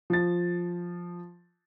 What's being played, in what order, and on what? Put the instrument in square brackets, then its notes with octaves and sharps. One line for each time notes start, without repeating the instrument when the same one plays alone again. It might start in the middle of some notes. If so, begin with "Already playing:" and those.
[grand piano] F3 A6